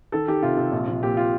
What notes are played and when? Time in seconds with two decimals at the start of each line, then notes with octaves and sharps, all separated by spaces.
0.12 D#3 A4
0.28 D#3 G4
0.42 C3 F4
0.57 C3
0.72 A#1
0.87 A#1
1.02 A#2 G4
1.17 F4